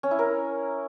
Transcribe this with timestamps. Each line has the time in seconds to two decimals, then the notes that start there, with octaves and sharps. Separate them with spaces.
0.03 C#4
0.11 E4
0.19 A#4